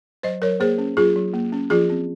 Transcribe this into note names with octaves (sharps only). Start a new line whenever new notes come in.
F#3 C5 D#5
F#3 A#4 C#5
A#3 G#4 C5
C#4
F#3 F4 G#4
F#3
A#3
C#4
F3 F4 G#4
C4